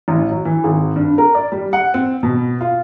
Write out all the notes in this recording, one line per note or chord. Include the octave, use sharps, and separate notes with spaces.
A1
F#3
E3
G#1
G2
A#4
D5
G3
F#5
C4
B2
F4